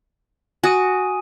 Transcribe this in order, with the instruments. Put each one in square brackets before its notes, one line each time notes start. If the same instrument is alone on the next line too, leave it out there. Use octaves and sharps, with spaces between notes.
[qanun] F#4 [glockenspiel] G#5 D#6 D#7